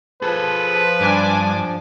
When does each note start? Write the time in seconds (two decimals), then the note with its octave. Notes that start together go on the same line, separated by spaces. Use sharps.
0.22 F3 G#4 A4 B4
1.01 G2 D4 G#5 D6